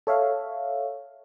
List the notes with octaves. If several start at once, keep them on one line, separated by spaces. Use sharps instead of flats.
A4 C#5 E5 F5